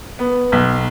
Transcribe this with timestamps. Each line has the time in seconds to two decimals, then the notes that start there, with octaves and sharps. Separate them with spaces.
0.19 B3
0.52 B1